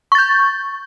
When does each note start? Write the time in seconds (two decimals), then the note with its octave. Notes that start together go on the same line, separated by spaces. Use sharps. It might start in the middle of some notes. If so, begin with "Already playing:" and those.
0.12 C#6
0.15 A6
0.18 G6